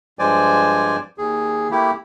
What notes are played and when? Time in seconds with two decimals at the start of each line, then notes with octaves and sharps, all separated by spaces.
0.19 G2 F3 G#3 C5 D5 G#5
1.18 D#2 G#4
1.71 A3 A#3 E4 G4